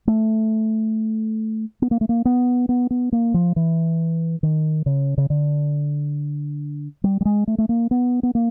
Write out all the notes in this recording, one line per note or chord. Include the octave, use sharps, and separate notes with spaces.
A3
B3
A#3
A3
A#3
B3
B3
B3
A#3
F3
E3
D#3
C#3
C#3
D3
G3
G3
G#3
A3
A3
A#3
B3
B3
A#3